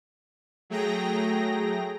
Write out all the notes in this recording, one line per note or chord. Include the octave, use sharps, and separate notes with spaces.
F#3 A3 G#4 G5 A#5 A#6